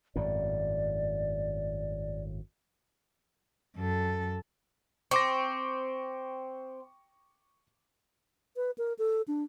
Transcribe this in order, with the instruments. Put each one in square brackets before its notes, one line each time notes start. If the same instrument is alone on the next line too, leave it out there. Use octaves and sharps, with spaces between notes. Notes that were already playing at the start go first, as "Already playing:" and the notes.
[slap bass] G#1 F#2 A2 [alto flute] D5
[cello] F#2 A4
[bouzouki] C4 [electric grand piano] C#6 D6 A#6
[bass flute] B4
A#4
A4
D4